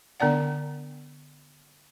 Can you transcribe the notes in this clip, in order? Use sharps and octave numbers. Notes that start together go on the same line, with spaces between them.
D3 B3 D4 D5 F#5